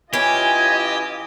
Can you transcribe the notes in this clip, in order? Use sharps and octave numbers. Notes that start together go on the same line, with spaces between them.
E3 C#4 F4 G4 D#5 G#5